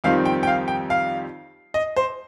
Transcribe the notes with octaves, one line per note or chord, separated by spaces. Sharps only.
F2 D#3 G3 C4 D#4 F5
G5
G5
F5
G5
F5
D#5
C5